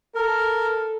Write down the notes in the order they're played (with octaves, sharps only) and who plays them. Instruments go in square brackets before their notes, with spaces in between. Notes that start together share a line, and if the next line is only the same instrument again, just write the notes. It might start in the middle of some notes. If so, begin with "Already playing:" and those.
[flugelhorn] A4 [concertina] A#4